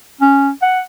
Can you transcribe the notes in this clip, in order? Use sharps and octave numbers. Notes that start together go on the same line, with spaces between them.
C#4
F#5